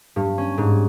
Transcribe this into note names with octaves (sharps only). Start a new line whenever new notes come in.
G2
C#4
G#2